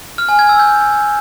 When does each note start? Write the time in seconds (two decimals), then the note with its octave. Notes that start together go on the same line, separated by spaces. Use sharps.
0.18 F6
0.29 G#5
0.39 G#6
0.49 E6
0.59 G6